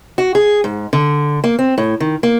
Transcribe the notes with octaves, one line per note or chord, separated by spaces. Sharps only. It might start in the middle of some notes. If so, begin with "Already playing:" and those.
F#4
G#4
G#2
D3
A#3
C4
A2
D#3
A#3